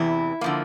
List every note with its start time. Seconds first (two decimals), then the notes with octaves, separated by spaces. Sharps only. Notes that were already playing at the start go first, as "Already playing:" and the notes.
Already playing: E2 C3 E3 E4
0.41 D3 F3 A#3